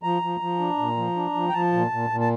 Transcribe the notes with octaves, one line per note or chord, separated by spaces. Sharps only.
F3 A#5
F3
F3
D4
A#2
F3
D4
F3
G5
F3 A5
A#2
A#2
A#2
A5